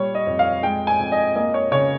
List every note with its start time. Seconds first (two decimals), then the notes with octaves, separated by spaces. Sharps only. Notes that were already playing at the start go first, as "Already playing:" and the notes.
Already playing: A#2 G3 C#5
0.15 D#5
0.27 F2
0.39 F5
0.63 G#3 G5
0.87 G#5
0.99 F2
1.12 D#5
1.35 A#3 D#5
1.54 C#5
1.72 C#3 C#5